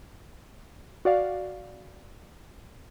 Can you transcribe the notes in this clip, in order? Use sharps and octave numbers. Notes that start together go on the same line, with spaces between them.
F#4 D5 F5